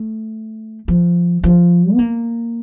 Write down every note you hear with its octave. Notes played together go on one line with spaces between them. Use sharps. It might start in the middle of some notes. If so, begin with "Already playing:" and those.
Already playing: A3
F3
F3
C4
A#3